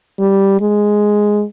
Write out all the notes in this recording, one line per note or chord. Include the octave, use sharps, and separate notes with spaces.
G3
G#3